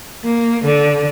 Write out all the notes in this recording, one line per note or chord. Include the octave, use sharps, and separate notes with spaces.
A#3
D3